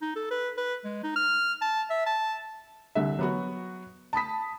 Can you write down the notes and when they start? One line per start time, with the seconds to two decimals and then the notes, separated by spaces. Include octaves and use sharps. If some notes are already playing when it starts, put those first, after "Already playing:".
0.01 D#4
0.16 A4
0.31 B4
0.57 B4
0.84 G#3
1.03 D#4
1.16 F6
1.61 A5
1.90 E5
2.06 A5
2.95 C2 D3 E5
3.19 F#3 B3 F#4
4.13 A5 B5 D#6 B6